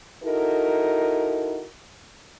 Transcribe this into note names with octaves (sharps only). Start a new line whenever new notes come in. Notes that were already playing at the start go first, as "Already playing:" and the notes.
D#4 E4 F#4 A4 A#4